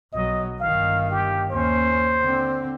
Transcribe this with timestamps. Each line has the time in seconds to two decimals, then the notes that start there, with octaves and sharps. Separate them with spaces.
0.13 B1 F#3 D#5
0.61 G1 D#3 F5
1.11 G4
1.51 D#2 C#4 C5
2.20 D3 C4